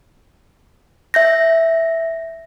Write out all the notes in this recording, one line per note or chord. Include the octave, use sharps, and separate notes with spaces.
E5 G6 A#6